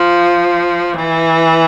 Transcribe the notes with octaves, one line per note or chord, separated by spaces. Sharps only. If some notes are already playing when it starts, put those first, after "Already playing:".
Already playing: F3
E3